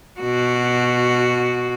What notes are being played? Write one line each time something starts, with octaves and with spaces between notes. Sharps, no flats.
B2 F#4